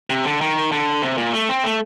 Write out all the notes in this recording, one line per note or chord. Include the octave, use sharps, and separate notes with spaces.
C3
D3
D#3
D3
C3
A#2
A3
C4
A3